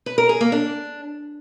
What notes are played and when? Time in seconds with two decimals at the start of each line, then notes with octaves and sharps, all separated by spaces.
0.06 B4
0.18 A#4
0.29 G#4
0.41 A#3
0.52 D4